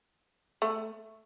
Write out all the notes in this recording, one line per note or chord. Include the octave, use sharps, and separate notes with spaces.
A3